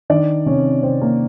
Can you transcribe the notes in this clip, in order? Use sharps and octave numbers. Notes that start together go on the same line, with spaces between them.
D#3 D4 D5
C3 C#4 C#5
C3 C4 C5
A#3 A#4